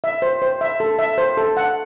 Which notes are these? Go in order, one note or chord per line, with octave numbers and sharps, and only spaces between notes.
E5
C5
C5
E5
A4
E5
C5
A4
F#5